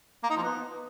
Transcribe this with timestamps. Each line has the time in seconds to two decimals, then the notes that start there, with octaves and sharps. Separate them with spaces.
0.24 A#3
0.30 D#4
0.37 F3
0.43 B3